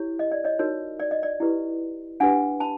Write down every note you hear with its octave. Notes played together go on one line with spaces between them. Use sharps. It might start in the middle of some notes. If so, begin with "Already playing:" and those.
Already playing: E4 G4 C#5
D#5
D5
C#5 D#5
D#4 F#4 A#4 C#5
D5
D#5
D5
E4 G4 B4
D4 G4 B4 F#5 G#5
A5 B5